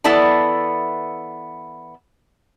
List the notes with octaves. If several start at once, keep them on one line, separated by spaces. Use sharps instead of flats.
E3 B3 E4 A4 D5 A5